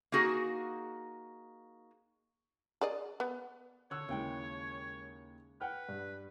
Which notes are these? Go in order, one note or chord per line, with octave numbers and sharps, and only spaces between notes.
A#3 D#4 F#4 G#4
G#4 D5 D#5
B3
D3 C#5 E6 F#6
D#2 C#3 G#3 E4 G5
B4 F#5 G5 F6
G2